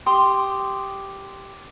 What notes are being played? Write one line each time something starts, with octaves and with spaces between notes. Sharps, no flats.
G4 C6 D#6